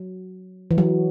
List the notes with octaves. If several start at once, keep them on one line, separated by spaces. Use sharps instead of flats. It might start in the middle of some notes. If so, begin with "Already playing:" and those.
Already playing: F#3
E3
F#3